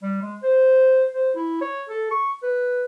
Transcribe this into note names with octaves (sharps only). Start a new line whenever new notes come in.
G3
G#3
C5
C5
E4
C#5
A4
C#6
B4